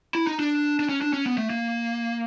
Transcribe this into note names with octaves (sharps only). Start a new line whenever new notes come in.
E4
D#4
D4
D4
C#4
D4
C#4
B3
A3
A#3